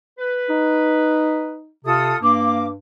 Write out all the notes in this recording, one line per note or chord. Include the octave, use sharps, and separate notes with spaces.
B4
D#4
C3 F4 A4 D#6
G2 A#3 D6